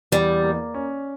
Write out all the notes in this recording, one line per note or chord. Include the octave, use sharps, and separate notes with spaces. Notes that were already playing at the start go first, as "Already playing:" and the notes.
E2 G3
A#3
C#4